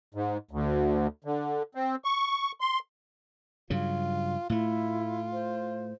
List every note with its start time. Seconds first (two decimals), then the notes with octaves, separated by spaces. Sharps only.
0.14 G#2
0.51 D2
1.24 D3
1.75 C4
2.04 C#6
2.60 C6
3.70 G2 C#3 F#3 F4
4.50 A2 A3 E4 F4
5.32 C5